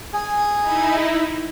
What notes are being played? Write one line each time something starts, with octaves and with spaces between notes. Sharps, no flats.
G#4 G#5
D#4 E4